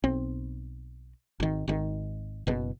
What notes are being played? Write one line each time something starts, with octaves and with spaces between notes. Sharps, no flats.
B1 C4
G#1 D#3
G#1 D#3
F#1 B2